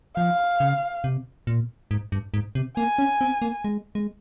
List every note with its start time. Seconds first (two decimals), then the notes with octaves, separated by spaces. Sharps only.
0.16 F3 F5
0.60 C#3
1.04 C3
1.47 A#2
1.91 G#2
2.12 G2
2.34 G#2
2.55 C3
2.77 A#3 G#5
2.98 C#4
3.21 C4
3.42 A#3
3.64 G#3
3.95 G#3